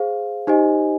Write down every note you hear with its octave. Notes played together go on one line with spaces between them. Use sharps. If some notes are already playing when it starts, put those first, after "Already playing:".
Already playing: G#4 C5 F5
D#4 G4 C5 D#5 G#5